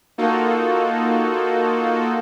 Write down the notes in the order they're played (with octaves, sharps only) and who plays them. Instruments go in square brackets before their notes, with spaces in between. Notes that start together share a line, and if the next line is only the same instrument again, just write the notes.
[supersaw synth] A#3 D#4 F4 F#4 A4